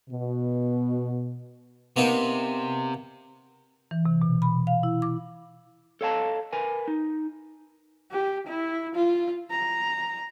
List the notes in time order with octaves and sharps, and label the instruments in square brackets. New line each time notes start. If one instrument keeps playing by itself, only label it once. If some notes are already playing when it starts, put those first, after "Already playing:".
[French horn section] B2
[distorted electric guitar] C3 [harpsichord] A#3 B3 D#4
[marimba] E3
C3
B2
B5
F5
E4
D6
[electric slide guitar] A4 C#5 F5 G5 A5 A#5
A#4 B4 G#5
D#4
[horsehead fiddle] G4
E4
F4
A#5